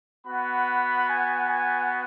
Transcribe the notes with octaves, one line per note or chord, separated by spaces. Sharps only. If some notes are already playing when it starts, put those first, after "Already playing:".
B3 F#4 B5
G#5
G#5